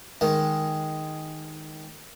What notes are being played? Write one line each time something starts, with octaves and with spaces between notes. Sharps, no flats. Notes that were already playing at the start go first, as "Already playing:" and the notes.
D#3 G#3